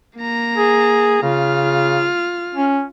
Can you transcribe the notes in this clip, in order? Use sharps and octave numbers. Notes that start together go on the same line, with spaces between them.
A#3 A#5
G#4
C#3 F4 F6
C#4